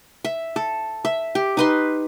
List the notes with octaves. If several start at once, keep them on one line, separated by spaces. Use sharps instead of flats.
E5
A4
E5
G4
D#4 B4 C6